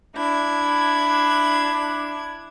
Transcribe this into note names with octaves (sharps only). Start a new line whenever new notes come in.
D4 E4 G#6